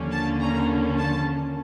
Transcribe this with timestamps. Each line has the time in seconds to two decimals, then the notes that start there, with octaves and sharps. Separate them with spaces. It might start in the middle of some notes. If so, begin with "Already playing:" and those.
Already playing: D#2 D3 F3 A#3 C#4
0.11 A5
0.40 A#5
0.98 A5